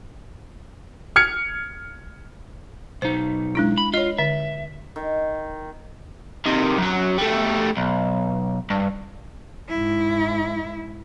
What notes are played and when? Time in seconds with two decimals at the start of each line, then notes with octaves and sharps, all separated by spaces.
1.16 F6 G#6 C#7
3.02 B1 D#4 C5
3.55 G#3 D4 E4
3.78 B5
3.94 F4 C#5 D#5
4.18 D3 E5
4.96 D#3
6.46 C3 D#3
6.78 F#2 F#3
7.18 G3 A3
7.77 B1
8.70 G2
9.69 G#2 E4